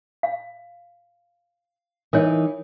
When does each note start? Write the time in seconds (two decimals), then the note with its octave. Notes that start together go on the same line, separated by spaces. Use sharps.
0.23 F5
2.13 E3 D#4 A#4 C#5